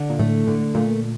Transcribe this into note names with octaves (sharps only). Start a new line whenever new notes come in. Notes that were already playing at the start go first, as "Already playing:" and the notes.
Already playing: D3
A#2
A2 A3
D3
A#2 A3